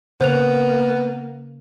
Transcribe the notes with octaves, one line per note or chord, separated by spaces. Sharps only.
C#3 A#3 B3 C5 F#6 F7